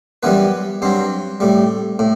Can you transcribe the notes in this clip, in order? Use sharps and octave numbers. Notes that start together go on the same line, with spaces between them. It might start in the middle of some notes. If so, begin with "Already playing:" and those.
F#2 E3 G3 B3 B4
G2 F#3 C4 C5
A2 G3
A2